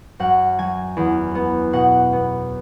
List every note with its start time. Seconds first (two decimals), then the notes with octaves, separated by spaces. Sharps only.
0.20 F#2 F#5
0.58 F#3 G#5
0.97 E2
1.35 B3
1.73 B2 F#5
2.13 B3